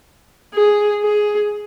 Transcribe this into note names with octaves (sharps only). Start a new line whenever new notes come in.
G#4
G#4